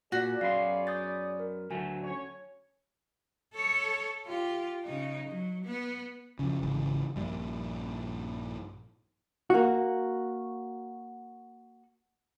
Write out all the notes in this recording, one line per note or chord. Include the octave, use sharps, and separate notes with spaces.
A#2 F#4 G#4 C#5 D5
F#2 B3 F5 C6
D#6 G6 A6
A#4
D2 F#3 A3 G#5
C#4 C#5
A4 C#5
F4 G4
C#3 D#4
F#3
B3
F2 C#3
G#1 C#3 E3
A#1 G2 A#2
A#3 F#4